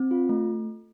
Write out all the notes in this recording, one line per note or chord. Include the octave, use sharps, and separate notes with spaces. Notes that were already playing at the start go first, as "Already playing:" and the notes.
Already playing: C4
F4
A3